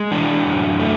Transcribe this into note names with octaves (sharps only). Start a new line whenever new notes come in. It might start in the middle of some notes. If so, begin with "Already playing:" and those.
Already playing: G#3
E3 D4
F#2
A3